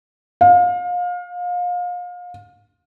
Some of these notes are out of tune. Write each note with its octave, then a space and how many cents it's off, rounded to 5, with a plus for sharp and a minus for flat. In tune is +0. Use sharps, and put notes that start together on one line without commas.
F5 +30